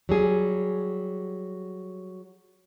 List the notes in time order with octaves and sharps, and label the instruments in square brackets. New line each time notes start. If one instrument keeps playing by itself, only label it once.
[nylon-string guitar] F#3 G3 G#4